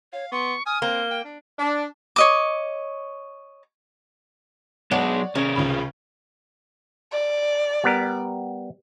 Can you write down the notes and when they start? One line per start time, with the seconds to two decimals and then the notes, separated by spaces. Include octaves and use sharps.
0.13 C#5 F5
0.32 B3 C6 C#6
0.66 G#5 D#6 F6
0.82 A#3 C4 G7
1.11 G5
1.24 D4
1.59 D4
2.16 C#5 D#5 D6
4.91 F#3 G#3 B3 D4 C#5 D5 F#5
5.35 C3 C#4 G#4 A#4
5.56 C#2 C#3 B5
7.12 D5
7.84 G3 B3 A#4